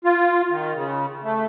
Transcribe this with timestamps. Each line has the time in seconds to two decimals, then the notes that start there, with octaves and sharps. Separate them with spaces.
0.04 F4
0.50 D#3
0.75 C#3
1.23 A3